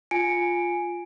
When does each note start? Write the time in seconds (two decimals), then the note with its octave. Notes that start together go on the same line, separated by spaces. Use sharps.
0.11 F4 G#5 C#7 D7